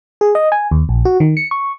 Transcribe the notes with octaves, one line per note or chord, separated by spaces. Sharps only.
G#4
D#5
G#5
D#2
A#1
F#4
D#3
C#7
C#6